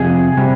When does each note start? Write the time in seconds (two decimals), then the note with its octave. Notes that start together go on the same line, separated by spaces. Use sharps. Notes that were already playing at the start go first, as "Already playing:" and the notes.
Already playing: F2 C3 G#4
0.37 C3 G3